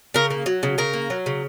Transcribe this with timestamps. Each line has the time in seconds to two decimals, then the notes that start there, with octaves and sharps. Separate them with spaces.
0.14 C#3 A#4
0.30 A#3
0.46 F#3
0.63 C#3
0.78 C#3 A#4
0.93 A#3
1.10 F#3
1.26 C#3